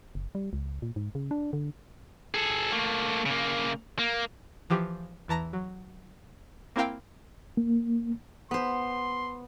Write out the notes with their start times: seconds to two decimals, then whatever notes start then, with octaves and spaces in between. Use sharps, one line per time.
0.15 F#1
0.35 G3
0.53 C#2
0.82 A#2
0.96 G#2
1.15 C#3
1.31 D4
1.53 D3
2.34 G#4 A4
2.72 A3 A#3
3.26 C#3 A#3
3.99 A#3
4.70 E3 F3 G4
5.28 E2 E3 A5 A#5 A#6
5.53 F#3
6.76 A#3 C4 E4 A#4 F5 G5
7.57 A#3
8.51 B3 C5 C6